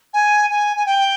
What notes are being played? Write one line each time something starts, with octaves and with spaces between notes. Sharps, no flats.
G#5
G#5
G#5
G5